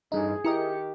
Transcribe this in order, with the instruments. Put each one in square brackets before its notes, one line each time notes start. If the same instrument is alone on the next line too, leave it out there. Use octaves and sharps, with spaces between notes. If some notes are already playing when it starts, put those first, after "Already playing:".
[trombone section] A1 [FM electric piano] G2 D#4 [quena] G#4
[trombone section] D#3 G4 [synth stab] E4 A#4 D#5 [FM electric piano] C#7